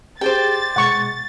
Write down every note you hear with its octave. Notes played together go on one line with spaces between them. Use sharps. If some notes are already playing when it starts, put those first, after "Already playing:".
G4 G#4 C5 D5 G5 A6
B2 G#3 F#5 C#6